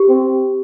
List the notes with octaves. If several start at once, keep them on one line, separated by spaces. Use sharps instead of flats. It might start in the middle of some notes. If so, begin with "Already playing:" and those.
Already playing: G4
C4